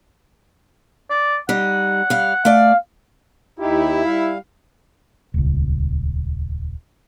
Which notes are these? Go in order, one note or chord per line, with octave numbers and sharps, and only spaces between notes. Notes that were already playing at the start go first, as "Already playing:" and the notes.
D5
G3 D#4 F#5
G3 F5
A3 D5 F5
D#2 D#4 E4 G4
G3 F5
D#1 C#2